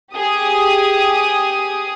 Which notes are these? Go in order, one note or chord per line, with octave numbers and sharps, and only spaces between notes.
G4 G#4 D#6